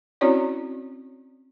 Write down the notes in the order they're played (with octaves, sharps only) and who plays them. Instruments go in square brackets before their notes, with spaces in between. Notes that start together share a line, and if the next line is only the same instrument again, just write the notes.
[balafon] C4 C#4 E4 F#4 C#5 D5